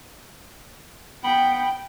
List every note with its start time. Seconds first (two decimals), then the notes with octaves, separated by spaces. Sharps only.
1.24 B3 G5